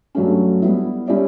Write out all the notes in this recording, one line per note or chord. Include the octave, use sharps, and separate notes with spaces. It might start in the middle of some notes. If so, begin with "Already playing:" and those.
G2 F#3 A3 C#4
G3 B3 E4
G3 C#4 E4 G4 D5